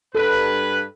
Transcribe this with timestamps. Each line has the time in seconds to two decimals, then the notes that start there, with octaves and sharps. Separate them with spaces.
0.15 G2 A4 B4